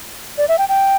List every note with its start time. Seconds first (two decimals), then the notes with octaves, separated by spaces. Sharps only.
0.38 D5
0.48 E5
0.58 G5
0.69 G5